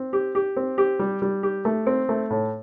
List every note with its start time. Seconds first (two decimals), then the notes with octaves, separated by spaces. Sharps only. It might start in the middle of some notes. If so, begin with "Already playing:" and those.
Already playing: C4
0.13 G4
0.35 G4
0.56 C4
0.78 G4
0.99 G3
1.22 G3
1.43 G4
1.65 A3
1.87 C4
2.09 A3
2.30 A2